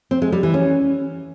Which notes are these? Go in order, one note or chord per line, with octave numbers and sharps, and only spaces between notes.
C4
G#3
G3
E3
C#4